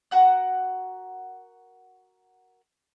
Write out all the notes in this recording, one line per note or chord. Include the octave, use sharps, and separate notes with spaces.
F#4 A#4 F#5 F#6